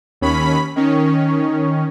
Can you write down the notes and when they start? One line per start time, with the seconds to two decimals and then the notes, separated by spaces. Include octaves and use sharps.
0.21 D#2 C#4 B5
0.76 D#3 C#4